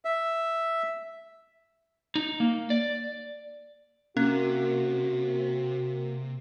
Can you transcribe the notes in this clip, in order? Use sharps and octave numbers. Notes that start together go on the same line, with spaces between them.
E5
D#4
A#3
D5
C3 A#3 C#4 F#4